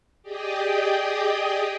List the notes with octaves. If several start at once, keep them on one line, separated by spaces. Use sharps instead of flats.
G4 G#4 D5 D#5 G5 D#6